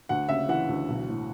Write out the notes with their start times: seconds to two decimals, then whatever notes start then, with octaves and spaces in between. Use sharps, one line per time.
0.09 D2 F#5
0.29 C#3 E5
0.49 E3 F#5
0.69 D2
0.88 B1
1.09 A2